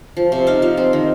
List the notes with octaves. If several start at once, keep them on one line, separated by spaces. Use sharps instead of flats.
F3
C3
D#4 F5
F3 F5
C4
D#3